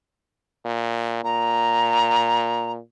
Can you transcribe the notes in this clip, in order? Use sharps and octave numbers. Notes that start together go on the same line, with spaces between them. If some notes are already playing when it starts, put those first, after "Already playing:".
A#2
A#2 A#5